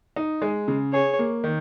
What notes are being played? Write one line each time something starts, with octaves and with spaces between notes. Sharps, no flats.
D#4
G#3
C#3
G#4 C#5
A#3
D#3